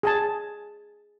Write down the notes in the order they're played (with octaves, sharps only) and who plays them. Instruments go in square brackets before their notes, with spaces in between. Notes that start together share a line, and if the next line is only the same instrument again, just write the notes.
[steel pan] G#4 G#5 A5